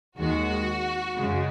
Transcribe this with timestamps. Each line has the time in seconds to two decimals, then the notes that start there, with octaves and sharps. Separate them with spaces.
0.18 D#2 D#3 G#3 F#4
1.17 F#2 C#3 G#3